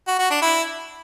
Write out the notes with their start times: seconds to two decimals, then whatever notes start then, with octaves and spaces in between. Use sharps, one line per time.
0.07 F#4
0.19 F#4
0.30 D4
0.42 E4